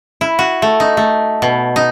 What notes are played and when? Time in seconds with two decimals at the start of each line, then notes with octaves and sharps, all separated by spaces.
0.21 E4
0.39 F#4
0.62 A3
0.80 D#4
0.97 A3
1.42 B2
1.76 D#4